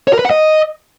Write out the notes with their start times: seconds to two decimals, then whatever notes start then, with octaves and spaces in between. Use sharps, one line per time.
0.08 C#5
0.13 A#4
0.19 B4
0.25 F#5
0.30 D#5